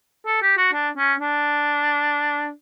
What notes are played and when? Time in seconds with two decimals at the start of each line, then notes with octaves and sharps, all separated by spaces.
0.26 A4
0.42 G4
0.58 F#4
0.73 D4
0.97 C#4
1.20 D4